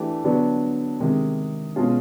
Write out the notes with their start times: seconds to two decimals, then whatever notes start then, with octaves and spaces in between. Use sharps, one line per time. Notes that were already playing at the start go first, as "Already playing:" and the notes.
Already playing: E3 A3 D4 G4
0.24 D3 F#3 B3 D4
1.00 C3 D#3 G#3
1.76 B2 G#3 C#4 F4 G#4